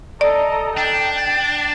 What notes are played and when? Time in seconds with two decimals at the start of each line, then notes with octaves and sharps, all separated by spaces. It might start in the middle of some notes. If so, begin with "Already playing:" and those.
0.21 A4 D5 D#5 A#5
0.77 D4 G5